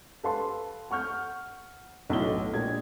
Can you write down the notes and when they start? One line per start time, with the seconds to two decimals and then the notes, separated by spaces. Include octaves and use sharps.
0.23 A4 B4 F5 A5 C6
0.90 F#5 C#6 F6 G6
2.10 B1 A2 F#3 A3 G7
2.53 A#1 A#2 G#3 G#4 G#6